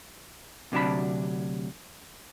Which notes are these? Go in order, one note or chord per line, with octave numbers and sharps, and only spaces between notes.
D2 C3 F#3 D4 A5 B5